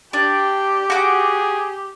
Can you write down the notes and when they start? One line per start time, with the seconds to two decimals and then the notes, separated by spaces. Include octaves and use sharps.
0.13 D4 G4 D5 G5
0.90 F#4 G#4 D6